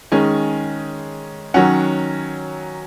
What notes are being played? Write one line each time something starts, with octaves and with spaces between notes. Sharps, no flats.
D#3 G#3 C#4 G#5
D#3 F#3 C#4 F#5